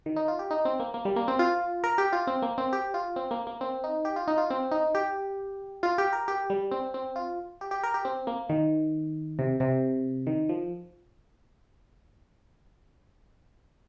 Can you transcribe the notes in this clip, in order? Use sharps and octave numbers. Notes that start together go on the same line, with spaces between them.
D#3
D#4
F4
G4
D#4
C4
A#3
A#3
G3
A#3
C4
F4
A#4
G4
F4
C4
A#3
C4
G4
F4
C4
A#3
A#3
C4
D#4
G4
F4
D#4
F4
C4
D#4
G4
F4
G4
A#4
G4
G3
C4
C4
F4
G4
G4
A#4
G4
C4
A#3
D#3
C3
C3
D#3
F3